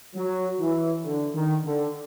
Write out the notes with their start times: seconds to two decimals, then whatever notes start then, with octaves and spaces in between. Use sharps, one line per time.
0.16 F#3
0.60 E3
1.05 D3
1.34 D#3
1.65 D3